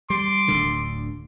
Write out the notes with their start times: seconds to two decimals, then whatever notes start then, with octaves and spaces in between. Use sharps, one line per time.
0.10 G3 C6 D6
0.48 D1 D2 D3